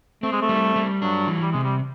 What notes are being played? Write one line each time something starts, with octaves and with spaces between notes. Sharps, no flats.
A3 C4
G#3
A3
G3
G3
F#3 D4
E3
G3
C3 G#3
G3